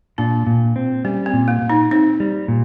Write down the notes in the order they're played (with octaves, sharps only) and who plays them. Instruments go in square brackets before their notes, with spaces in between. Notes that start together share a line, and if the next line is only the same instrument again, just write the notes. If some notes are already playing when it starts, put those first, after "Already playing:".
[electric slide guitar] A#2 [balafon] D4
[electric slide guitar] A#2
C4
[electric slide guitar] G3 [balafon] C#4
[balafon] C4
[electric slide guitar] A#2
[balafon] A#3
[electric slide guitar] A#2
[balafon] D#4
[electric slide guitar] C4 [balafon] D#4
[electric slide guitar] G3
A#2